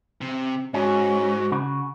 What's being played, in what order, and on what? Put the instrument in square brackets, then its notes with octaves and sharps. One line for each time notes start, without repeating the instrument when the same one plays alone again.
[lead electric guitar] C3
[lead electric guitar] G#2 [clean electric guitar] C#4 [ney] F#4
[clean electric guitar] C#3 F#4